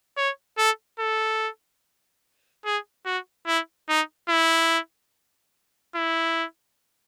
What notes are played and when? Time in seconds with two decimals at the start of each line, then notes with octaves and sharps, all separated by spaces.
0.17 C#5
0.58 A4
0.99 A4
2.65 G#4
3.05 F#4
3.46 E4
3.89 D#4
4.29 E4
5.95 E4